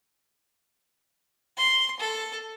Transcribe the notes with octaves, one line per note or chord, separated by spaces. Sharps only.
C6
A4